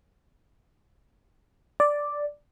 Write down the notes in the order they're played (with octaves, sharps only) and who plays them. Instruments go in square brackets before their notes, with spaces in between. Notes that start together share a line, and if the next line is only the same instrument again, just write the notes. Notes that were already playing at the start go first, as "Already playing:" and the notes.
[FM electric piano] D5